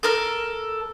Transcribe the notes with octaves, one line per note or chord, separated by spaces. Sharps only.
A4 A#4 F6